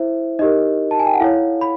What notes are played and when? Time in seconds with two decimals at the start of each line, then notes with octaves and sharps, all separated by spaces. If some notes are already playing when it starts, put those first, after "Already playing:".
Already playing: E4 A4 C5 E5
0.39 D#4 G4 A#4 D#5
0.91 A5
0.99 G#5
1.06 G5
1.14 F#5
1.20 E4 A4 C#5 F5
1.61 B5